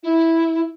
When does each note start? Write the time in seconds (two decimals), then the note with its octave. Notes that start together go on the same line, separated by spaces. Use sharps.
0.03 E4